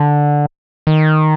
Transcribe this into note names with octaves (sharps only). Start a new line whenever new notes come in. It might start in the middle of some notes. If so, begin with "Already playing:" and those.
Already playing: D3
D#3